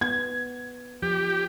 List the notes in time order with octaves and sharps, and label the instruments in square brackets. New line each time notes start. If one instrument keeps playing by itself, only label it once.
[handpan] B3 [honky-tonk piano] G#6
[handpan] F3 [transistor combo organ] G4